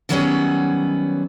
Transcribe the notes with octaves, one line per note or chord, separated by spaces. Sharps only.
D3 D#3 F#3 G3 B3 C#4